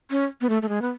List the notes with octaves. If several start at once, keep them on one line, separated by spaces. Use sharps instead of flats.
C#4
B3
A3
A3
G#3
B3